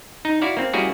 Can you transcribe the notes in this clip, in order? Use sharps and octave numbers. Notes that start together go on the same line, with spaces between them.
D#4
E4 F#4 D5 F5
A#3 C4
G3 A#3 C#4 E4 F#4 G#4